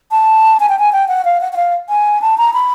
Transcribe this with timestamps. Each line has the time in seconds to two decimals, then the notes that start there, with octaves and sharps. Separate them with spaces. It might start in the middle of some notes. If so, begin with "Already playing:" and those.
0.11 A5
0.60 G#5
0.69 G5
0.79 G#5
0.93 G5
1.08 F#5
1.25 F5
1.41 F#5
1.53 F#5
1.56 F5
1.89 G#5
2.22 A5
2.38 A#5
2.54 B5